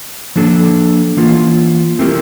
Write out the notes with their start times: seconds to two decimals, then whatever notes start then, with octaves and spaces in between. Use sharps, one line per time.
0.36 F3 A#3 D4 A4
1.17 E3 A#3 F4
1.99 A3 C4 E4 G4 A#4